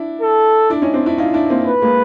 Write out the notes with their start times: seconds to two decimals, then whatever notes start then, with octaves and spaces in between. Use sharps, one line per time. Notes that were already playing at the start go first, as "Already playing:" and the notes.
Already playing: D4 E4
0.21 A4
0.70 D4 E4
0.82 C#4 D#4
0.94 C4 D4
1.06 D4 E4
1.18 D#4 F4
1.34 D4 E4
1.50 A#3 C4
1.66 B4
1.82 G#3 A#3